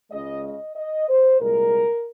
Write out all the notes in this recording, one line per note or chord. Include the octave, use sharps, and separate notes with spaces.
C#2 C#3 G#3 D#5
D#5
D#5
C5
C2 A#2 G#3 A#4